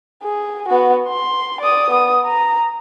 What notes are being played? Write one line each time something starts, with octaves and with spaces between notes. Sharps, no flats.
G#4
B3 F#4
C6
D5 D#6
B3 D#6
A#5